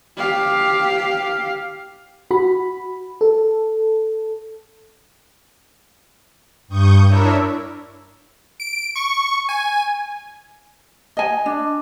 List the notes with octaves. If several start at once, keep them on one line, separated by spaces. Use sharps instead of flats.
G4 F5
F#4 B5
A4
G2 C#6 D#6 G6
D4 E4 A#4 C#5 E5
D7
C#6
G#5
D#5 G#5
D4